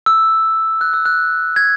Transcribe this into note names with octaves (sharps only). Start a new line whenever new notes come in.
E6
F#6
E6
F#6
G#6